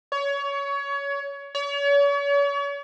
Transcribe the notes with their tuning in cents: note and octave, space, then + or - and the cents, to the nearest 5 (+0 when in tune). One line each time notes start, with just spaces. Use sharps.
C#5 +25
C#5 +40